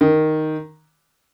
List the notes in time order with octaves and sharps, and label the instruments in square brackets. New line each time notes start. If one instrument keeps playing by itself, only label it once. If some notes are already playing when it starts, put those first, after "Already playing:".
[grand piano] D#3